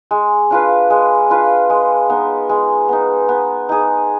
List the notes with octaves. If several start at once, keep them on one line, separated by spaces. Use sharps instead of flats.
G#3
D4 F4 B4
G#3
D4 F4 B4
G#3
B3 D#4
G#3
B3 D#4
B3
D#4 G#4